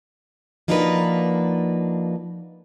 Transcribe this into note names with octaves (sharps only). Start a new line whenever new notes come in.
F3 A#3 D4 D#4 F#4 B4